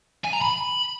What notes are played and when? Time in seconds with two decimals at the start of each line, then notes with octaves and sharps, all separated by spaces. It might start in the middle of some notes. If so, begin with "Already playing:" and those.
0.25 G#5
0.33 A#5
0.41 B5